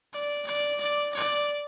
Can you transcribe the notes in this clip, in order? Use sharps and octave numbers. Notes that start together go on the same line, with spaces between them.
D5
D5
D5
D5